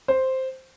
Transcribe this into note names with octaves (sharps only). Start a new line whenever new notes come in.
C5